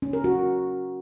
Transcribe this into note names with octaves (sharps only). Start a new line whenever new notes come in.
C#4
A#4
F#4